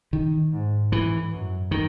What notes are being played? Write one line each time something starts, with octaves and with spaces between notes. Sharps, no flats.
D#3
G#2
A2 E3
F#2
D#3